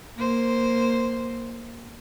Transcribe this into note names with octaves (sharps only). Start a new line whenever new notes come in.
A#3 C5